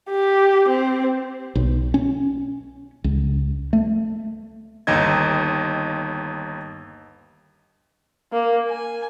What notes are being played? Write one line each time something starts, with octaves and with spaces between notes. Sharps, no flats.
G4
C4
B1
C#4
C#2
A3
G1 D#2 D#4 D#5 G#6
A#3
G#5